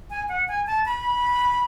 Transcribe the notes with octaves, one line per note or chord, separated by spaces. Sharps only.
G#5
F#5
G#5
A5
B5